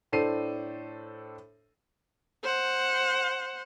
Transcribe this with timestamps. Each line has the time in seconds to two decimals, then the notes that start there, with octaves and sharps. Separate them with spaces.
0.12 A2 D4 A4 C5 C7 D#7
2.44 C5 F#5